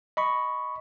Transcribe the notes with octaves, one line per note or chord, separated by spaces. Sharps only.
D#5 B5 C#6